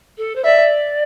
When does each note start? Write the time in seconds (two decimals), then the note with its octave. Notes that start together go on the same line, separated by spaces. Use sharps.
0.17 A4
0.35 C5
0.44 D5 E5